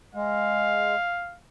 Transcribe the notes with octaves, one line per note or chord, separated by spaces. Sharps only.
G#3 F5